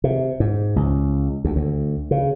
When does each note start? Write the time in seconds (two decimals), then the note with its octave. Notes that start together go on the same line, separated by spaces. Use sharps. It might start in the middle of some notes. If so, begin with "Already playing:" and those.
0.04 C3
0.40 G#2
0.76 C#2
1.44 D2
1.56 D2
2.11 C#3